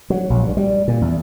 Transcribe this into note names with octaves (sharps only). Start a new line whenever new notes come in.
F#3
A#1
G2
G3
A#2
E2